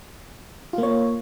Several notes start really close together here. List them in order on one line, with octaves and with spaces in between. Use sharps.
F4 A#3 C#5